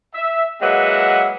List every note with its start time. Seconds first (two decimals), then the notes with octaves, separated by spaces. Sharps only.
0.15 E5
0.62 F#3 G#3 A#3 B4 E5 F#5